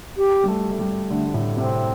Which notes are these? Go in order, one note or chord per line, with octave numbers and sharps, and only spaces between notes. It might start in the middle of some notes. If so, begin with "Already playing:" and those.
G4
G3
A3
A3
G3
D3 A3
A2
C3 C4